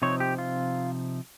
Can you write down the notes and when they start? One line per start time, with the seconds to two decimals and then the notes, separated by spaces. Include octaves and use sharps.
0.02 C3 F3 C4 D#4 C#5
0.20 G4
0.38 F4